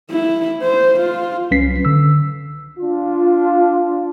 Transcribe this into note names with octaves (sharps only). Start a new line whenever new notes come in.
E4
C5
F4
C2 F#3 C#4 B4 B6 C7
D3 E6
D4 F4